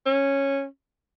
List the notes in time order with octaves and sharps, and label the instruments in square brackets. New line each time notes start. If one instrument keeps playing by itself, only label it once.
[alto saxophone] C#4